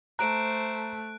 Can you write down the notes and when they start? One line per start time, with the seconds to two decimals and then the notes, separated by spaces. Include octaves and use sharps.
0.19 A3 C5 A#5 F#6 D7